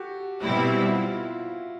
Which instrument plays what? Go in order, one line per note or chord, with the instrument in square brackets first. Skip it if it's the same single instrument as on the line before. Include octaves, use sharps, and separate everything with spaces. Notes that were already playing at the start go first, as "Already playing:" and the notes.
Already playing: [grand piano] F#4 G4 A4
[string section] B2 G3 C4 E4 [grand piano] F#4
[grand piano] E4
F4